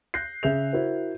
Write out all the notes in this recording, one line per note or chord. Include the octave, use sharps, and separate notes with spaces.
F#6 G6 A#6 C7
C#3 G#4 E5 G6 F7
E4 F#4 A#4 C5